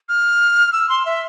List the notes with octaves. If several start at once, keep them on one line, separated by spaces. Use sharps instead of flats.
F6
E6
C6
E5